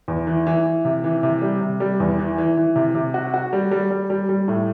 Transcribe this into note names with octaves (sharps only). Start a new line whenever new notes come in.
E2
E3
E3
E3
C3
E3
C3
G3
C3
G3
E2
E3
E3
E3
C3
C3
F#4
F#4
G3
G3
G3
G3
G3
A2